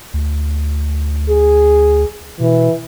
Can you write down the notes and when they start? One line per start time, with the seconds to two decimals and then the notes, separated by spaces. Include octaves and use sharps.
0.14 D2
1.29 G#4
2.40 B2 E3